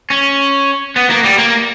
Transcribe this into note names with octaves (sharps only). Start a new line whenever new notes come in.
C#4
B3
A#3
G3
A#3